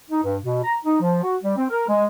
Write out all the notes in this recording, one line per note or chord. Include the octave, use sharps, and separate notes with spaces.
D#4
G2
B2
A#5
D#4
F3
F#4
G3
C4
A#4
G#3